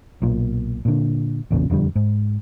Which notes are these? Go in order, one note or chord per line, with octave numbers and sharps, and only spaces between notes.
B1 A#2
A#2 D3
A1 E2 A#2 C#3
E1 F2 D3 G3
G#2